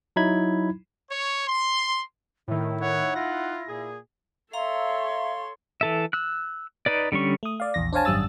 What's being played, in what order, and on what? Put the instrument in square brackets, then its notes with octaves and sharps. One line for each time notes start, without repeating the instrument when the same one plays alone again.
[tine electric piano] F#3 D#4 E4 B5 G#6
[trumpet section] C#5
C6
[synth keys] A2 D#3 [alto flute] E4
[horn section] D#4 F#5 [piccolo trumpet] C#5
[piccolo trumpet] F4 [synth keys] A#6
[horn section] A#2 G#4
[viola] A4 C#5 [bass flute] E5 [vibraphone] F5 A#5 [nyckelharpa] C6
[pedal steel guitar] E3 A4 E5
E6 F#6
D#4 B4 D5
D3 G3 C#4 C#6
[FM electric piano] A3 D#6
D5 F5
A#1 E2 A#6
D4 C5 C#5 F5 G#5 A5
G#1 F#2 G3 D#6 E6 A6